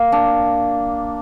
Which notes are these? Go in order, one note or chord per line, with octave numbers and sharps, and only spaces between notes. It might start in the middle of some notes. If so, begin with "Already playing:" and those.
Already playing: A#3
D4